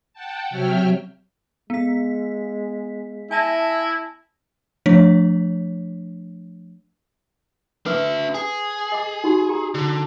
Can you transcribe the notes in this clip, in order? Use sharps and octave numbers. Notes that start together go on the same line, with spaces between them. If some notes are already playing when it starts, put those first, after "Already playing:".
F#5 G5 A5
C3 F#3 C#5 E5 G5 F6
G#3 B3 B6
E4 E5 G#5 A5 A#6
F3 A3 D4 C#5 B6
D4 B4 E5
G#4
D#5 D6
D#4 F#4 G4
G4 A#5
D3